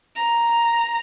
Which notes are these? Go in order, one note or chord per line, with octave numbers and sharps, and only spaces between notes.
A#5